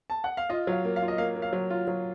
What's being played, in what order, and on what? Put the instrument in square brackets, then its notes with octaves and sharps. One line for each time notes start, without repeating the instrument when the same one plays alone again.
[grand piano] A5
F#5
F5
[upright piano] F4 [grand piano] D#5
[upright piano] F#3
[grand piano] F5
[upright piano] A#3
[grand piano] F5
[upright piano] F4
[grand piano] D#5
[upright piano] A#3 [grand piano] F5
[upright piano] A#3
[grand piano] F5
[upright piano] F#3
F4
F#3